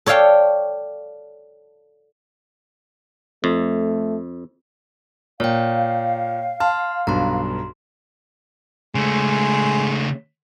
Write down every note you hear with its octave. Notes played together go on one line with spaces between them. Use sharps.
A4 C#5 D5 F5 G5 A5
F2 A3
A#2 C#5 F5 G5
A5 C6 F6
B1 G2 A#5 C6
C#3 G#3 A3